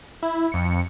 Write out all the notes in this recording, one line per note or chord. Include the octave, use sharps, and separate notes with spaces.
E4
F2 C#7